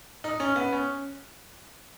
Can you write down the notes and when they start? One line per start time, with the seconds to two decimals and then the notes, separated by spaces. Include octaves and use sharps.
0.24 D#4
0.40 C#4
0.56 B3
0.73 C#4